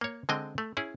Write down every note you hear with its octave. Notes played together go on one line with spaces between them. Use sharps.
A#3 C#5
D3 G#3 C4 D#5 G5
A3
C#4 E4 G#4